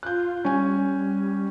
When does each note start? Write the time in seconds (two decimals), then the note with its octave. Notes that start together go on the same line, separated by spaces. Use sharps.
0.03 F4 F#6 G6
0.45 G3 C#4 G#5